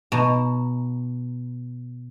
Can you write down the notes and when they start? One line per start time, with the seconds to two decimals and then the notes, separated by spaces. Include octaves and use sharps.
0.12 B2 D#4 A5 A#5